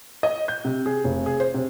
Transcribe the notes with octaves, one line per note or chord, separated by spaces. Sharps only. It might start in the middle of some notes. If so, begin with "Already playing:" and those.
D#5
G6
C3
G#4
F1
G#4
C5
C3